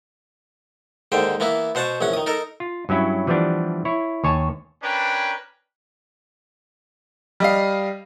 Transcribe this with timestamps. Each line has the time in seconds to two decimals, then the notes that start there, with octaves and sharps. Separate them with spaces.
1.12 D#2 G#2 D3 C5 G5
1.40 E3 A#3 B3 E4
1.75 B2 C5 F#5 A5 C#6
2.01 A#1 E2 C#4 F#5
2.13 D#3 D#6
2.26 D#4 A4 A#4
2.60 F4
2.89 G2 F#3 C#4 E4
3.27 E3 F3 G3 B3 D4
3.85 E4 C#5
4.24 D#2 C#5 G#5 A5
4.83 C#4 D4 A#4 B4 G5 G#5
7.40 G3 D#5 F5